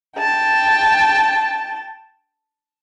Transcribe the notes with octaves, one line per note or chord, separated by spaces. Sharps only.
G5 A5